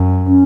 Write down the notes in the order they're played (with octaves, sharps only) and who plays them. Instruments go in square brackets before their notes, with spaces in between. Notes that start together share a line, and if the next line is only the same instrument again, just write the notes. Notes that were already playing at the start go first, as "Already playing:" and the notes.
Already playing: [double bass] F#2
[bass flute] C#4